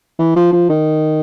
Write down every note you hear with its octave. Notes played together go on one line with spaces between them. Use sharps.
E3
F3
F3
D#3